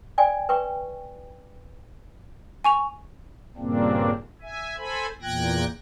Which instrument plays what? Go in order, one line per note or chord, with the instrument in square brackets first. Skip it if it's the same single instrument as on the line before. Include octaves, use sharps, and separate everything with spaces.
[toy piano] D5 G5 G#5
B4 G5 C#6
[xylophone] G#5 C#6 F7
[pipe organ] G2 A#2 C#3 A#3 C4 D4
E5 G#5
A4 C5 G#5 B5
E2 A#2 G5 F#6 G#6 A#6